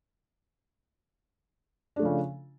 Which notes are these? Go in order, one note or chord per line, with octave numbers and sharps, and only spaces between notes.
C#3 F3 A3 D4